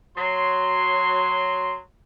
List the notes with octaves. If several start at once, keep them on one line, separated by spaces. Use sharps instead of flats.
F#3 C6